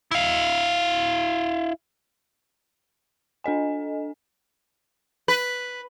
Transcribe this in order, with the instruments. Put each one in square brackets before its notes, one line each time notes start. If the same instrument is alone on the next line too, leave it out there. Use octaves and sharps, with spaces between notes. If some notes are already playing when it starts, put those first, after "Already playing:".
[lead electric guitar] E4 F5
[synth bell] D4 A4 D#5 G#5
[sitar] B4